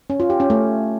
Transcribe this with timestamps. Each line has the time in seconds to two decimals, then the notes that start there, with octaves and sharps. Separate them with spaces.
0.10 C#4
0.20 F4
0.30 G4
0.40 C#4
0.50 A3